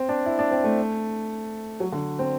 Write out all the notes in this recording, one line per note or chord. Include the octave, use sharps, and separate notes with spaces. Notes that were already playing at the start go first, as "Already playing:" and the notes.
Already playing: C4
D4
E4
D4
C4
A3
F#3
D3
C4